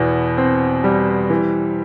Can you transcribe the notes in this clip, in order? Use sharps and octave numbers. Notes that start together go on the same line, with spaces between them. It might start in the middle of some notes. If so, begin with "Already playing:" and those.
Already playing: E2 B2
C4
G3
E3